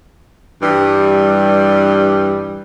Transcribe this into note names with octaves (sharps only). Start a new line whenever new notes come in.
G2 E3 G3